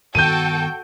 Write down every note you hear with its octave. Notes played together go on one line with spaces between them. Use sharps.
G2 D#3 B3 F#4 A4 G5 G6 D#7